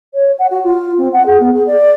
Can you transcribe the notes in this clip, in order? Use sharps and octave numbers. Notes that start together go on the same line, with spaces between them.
C#5
F#5
F#4
F4
C4
F#5
G#4
B3
G#4
D5